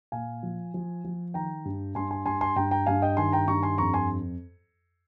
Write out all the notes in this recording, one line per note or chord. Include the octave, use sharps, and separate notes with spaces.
A#2 F5 G#5
F3
F3
F3
D#3 G5 A#5
G2
G2 G#5 C6
G#5 C6
G2 G#5 C6
G#5 C6
G2 G5 A#5
G5 A#5
G2 F5 G#5
D#5 G5
D#3 G#5 C6
G5 A#5
G2 A#5 C#6
G#5 C6
F2 A#5 C#6
G#5 C6